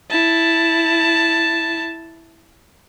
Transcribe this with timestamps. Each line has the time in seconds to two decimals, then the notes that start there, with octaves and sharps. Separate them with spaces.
0.10 E4 A5